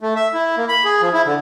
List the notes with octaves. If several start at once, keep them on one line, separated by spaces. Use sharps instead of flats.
A3
E5
E4
A#3
B5
G#4
F3
E4
D3